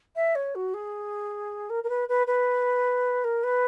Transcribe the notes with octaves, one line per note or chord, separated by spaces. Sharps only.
E5
C#5
F#4
G#4
A#4
A#4
B4
B4
B4
A#4
B4